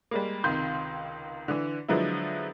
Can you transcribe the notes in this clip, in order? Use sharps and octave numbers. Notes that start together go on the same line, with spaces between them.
G3 G#3 A#3
C#2 C3 D#3 C6 G6
D3 E3
D3 F3 F#3 G#3 B3 E4